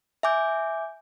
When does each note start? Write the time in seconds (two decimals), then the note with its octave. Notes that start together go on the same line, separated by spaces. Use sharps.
0.23 E5 G#5 D6 G6